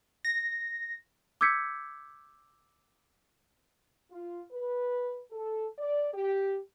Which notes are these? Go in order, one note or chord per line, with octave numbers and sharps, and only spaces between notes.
A#6
D6 E6 G6 G#6 B6 C#7
F4
B4
A4
D5
G4